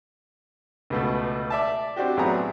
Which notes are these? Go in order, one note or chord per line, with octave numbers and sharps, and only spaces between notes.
C#2 B2 A3
D5 E5 A5
C4 D4 F#4 G4
A1 F#3 B3 G#4 A#5